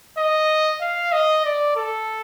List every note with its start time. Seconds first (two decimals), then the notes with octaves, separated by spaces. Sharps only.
0.18 D#5
0.81 F5
1.12 D#5
1.45 D5
1.76 A4